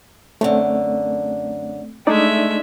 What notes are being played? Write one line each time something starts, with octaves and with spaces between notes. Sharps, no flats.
F#2 D3 A3 C4
G#3 A3 D4 D#4 D5 E5